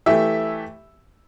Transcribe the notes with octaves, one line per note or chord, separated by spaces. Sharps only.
E3 A3 G4 E5